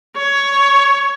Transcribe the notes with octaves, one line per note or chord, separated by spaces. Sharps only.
C#5